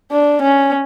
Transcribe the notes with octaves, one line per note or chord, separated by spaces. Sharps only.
D4
C#4